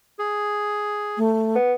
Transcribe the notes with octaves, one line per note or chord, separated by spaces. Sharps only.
G#4
A3
B3